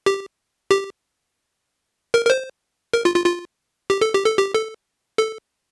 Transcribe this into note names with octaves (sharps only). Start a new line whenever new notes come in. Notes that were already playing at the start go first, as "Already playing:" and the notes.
G4
G4
A#4
A#4
C5
A#4
F4
F4
F4
G4
A4
G4
A4
G4
A4
A4